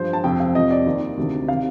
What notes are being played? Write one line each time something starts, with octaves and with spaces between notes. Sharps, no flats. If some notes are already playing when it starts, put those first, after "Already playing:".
Already playing: G2 F3 C5
A5
F2 C3 F3 G5
F5
F2 C3 F3 D#5
D5
D#2 D#3
D2 C3 D#3
C3 D#3 F5